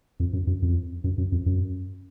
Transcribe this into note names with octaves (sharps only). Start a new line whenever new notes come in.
F2
F#2
F#2
F2
F#2
F#2
F2
F#2